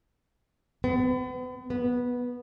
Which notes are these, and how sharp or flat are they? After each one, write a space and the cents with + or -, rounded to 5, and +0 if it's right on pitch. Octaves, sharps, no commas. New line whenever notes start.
B3 +40
B3 -10